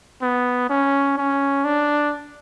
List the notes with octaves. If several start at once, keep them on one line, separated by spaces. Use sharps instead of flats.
B3
C#4
C#4
D4